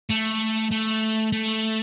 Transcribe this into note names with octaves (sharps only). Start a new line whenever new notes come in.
A3
A3
A3